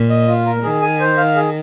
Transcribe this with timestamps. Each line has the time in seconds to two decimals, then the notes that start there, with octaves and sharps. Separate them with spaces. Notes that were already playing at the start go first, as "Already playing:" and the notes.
Already playing: A#2
0.09 D#5
0.28 F4
0.46 A#4
0.63 D#3 G#4
0.82 G#5
1.00 C5
1.17 F5
1.36 G#4